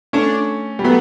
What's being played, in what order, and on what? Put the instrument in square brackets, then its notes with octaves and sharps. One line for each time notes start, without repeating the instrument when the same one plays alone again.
[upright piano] A3 C#4 [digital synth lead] D4
[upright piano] G3
[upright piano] F#3 A3 [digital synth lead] B3